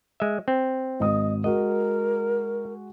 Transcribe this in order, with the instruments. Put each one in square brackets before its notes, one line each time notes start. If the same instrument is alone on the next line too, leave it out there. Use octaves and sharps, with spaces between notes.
[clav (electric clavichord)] G#3 E5
C4
[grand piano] G#1 D#6 [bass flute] D#5
[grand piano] G#3 F#4 [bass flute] A#4 [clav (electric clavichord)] D#5